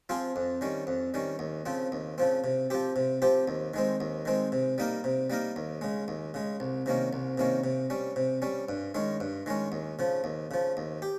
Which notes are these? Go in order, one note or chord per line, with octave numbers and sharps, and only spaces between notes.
F3 C4 F4 G#4
F2
D#3 G3 C#4
F2
D#3 G3 C#4
D#2
C#3 F3 C4
D#2
C#3 F3 C4
C3
F3 C4 G4
C3
F3 C4 G4
D#2
D#3 G#3 C4
D#2
D#3 G#3 C4
C3
G3 A#3 D#4 A#4
C3
G3 A#3 D#4 A#4
D#2
C#3 G#3
D#2
C#3 G#3
C2
C3 D#3 A#3 C#4
C2
C3 D#3 A#3 C#4
C3
G3 C#4
C3
G3 C#4
G2
D#3 G#3 C#4
G2
D#3 G#3 C#4
D#2
C#3 F3
D#2
C#3 F3
D#2
G4